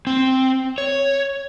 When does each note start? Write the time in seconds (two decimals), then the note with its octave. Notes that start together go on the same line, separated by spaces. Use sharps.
0.07 C4
0.78 C#5